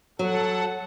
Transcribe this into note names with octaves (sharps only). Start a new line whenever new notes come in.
F#3 A4 F#5